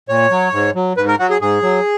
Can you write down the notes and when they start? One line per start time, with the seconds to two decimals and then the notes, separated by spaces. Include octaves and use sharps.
0.09 A#2 C#5
0.31 F#3
0.53 G#2
0.75 F#3
0.97 G#2 B4
1.08 A#4
1.19 F#3 F#4
1.30 G#4
1.41 G#2 G#4
1.63 F#3